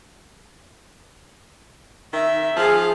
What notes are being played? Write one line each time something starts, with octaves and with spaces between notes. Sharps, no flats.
D#3 E5
F3 G#4 F5